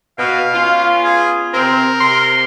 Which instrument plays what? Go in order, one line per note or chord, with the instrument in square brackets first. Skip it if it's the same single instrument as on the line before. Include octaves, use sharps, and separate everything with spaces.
[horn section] B2 [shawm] F5
[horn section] B3 C#4 F4
[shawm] G#4
[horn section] C3 C4 [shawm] A#4
[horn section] C3 C6